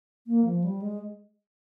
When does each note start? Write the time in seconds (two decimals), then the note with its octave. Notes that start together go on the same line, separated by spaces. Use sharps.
0.27 A#3
0.45 F3
0.64 G3
0.82 G#3